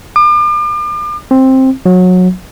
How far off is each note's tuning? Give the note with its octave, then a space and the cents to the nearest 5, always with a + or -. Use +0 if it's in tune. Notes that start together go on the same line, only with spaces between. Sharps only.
D6 +40
C4 +10
F#3 -20